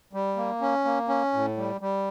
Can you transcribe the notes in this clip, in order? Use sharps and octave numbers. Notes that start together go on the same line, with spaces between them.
G3
A#3
C#4
A#3
C#4
A2
G3
G3